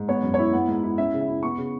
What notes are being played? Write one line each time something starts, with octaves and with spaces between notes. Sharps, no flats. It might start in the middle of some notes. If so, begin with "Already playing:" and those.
Already playing: G#2
B3 C#5
F#2
E4 C#5
B3 F#5
G#2
E4
C#4 E5
C#3
E5
E4
B3 C#6
C#3